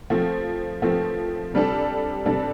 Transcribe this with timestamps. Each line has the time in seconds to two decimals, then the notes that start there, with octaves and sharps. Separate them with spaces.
0.10 F3 A3 C4
0.82 F3 A3 C4
1.54 C3 G3 D4 A4
2.26 C3 G3 D4 A4